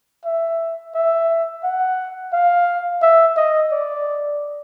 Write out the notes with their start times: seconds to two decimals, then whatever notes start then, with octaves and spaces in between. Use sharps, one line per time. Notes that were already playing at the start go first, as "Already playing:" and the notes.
0.25 E5
0.95 E5
1.64 F#5
2.33 F5
3.02 E5
3.37 D#5
3.72 D5